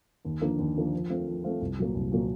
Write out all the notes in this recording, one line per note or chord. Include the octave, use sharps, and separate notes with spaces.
D#2
D3 F3 A#3 D4
D#2
D3 F3 A#3 D4
F3
A3 C4 F4
F3
A3 C4 F4
C2
A#2 F#3 A#3
C2
A#2 F#3 A#3